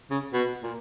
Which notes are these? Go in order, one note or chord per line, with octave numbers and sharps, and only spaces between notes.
C#3
B2
A#2